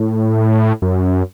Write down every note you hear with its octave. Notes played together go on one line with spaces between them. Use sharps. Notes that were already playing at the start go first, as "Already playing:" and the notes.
Already playing: A2
F#2